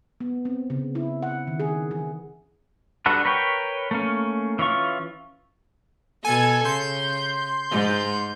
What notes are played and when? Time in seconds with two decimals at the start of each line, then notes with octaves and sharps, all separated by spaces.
0.20 B3
0.45 C4
0.70 C#3
0.95 E4
1.23 F#5
1.47 D#3
1.60 G#4
1.91 E3
3.06 G3 D4 F#4 A4 B4
3.25 A#4 B4 C#5 G5 C#6
3.91 A3 A#3 C#4
4.59 E3 C#4 F4 C#6
6.25 B2 A4 G#5
6.65 C#3 C6 G6
7.71 G#2